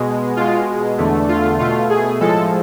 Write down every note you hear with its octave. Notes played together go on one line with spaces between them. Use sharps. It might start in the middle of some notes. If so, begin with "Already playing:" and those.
Already playing: B2 G#3
B2 G#3 F4
E2 D3 A3
F4
B2 A3 F4
G#4
A2 F3 G#3 A4